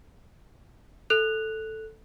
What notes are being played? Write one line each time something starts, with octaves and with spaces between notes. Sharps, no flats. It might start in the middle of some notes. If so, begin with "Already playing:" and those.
A4 F#6 F7